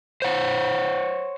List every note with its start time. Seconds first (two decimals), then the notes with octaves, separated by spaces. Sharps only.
0.22 C5 C#5 F#5